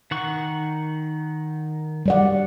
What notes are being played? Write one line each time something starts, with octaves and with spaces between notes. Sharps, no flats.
D#3 F#5 C#6
G3 D5 F#5